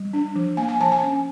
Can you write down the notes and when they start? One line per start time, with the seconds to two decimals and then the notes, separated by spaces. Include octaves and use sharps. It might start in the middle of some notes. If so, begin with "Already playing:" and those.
Already playing: G3
0.13 D4
0.36 F3
0.57 A#3 G#5
0.69 G#5
0.80 F3 A5
0.92 G#5
1.03 C#4